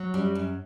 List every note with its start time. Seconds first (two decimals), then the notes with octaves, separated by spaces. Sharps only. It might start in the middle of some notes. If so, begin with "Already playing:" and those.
Already playing: F#3
0.14 F#2 G3
0.35 F#2